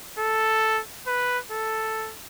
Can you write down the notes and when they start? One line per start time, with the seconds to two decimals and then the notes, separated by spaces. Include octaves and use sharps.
0.19 A4
1.07 B4
1.52 A4